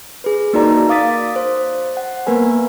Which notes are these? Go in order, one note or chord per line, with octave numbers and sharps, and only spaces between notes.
G#4 B4
A#3 D#4 F#4 A#4 D5 A#5
F5 D6 D#6 A6 B6
C5
F#5
A#3 B3 A#4 B4 G#5